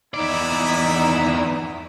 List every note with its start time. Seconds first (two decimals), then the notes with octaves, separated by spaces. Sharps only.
0.14 E2 B3 D#4 E4 D5